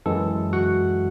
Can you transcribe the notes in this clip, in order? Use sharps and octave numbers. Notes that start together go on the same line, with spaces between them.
F#2 E3 G#3 A4
F#4 F#5